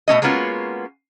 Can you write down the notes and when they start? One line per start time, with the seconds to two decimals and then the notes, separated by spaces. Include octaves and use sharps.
0.08 B2 A3 C#4 D#5
0.22 G#3 A#3 B3 C#4 F4 F#4